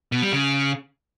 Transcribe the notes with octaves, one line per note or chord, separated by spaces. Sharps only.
B2
G3
C#3